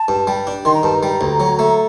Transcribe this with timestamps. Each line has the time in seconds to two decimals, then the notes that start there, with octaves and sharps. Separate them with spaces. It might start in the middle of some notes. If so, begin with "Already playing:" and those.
Already playing: A5
0.08 G2
0.27 G3
0.47 D4
0.65 D#3 C6
0.75 A#5
0.83 G2 A5
0.95 A#5
1.03 G3
1.21 D2
1.40 F#3
1.59 A3